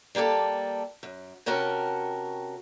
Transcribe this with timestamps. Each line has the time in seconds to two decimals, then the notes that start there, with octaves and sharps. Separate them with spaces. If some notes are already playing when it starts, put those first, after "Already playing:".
0.15 G3 A#3 G4 A4 A5
1.03 F#2
1.46 C3 C#4 F#4 A#4 G5 A5